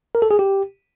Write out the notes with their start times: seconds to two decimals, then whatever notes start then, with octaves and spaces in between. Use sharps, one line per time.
0.15 A#4
0.22 A4
0.31 G#4
0.39 G4